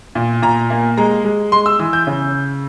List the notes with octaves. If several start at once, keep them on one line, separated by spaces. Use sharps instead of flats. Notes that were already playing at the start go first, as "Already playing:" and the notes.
A#2
A#2 A#5
A#3
G#3 A#5
G#3
G#3 C6
E6
E3 E6
G6
C#3